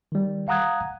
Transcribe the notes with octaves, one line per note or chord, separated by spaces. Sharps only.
D#3 G3
F5 F#5 A#5 D#6 F#6 G#6